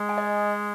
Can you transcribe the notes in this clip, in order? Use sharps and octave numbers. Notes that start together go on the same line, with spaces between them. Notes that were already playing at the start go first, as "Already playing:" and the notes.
Already playing: G#3
G#5
D#5